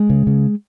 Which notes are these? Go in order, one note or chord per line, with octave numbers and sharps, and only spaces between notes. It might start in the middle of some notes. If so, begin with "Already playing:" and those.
Already playing: G#3
C#3
C#3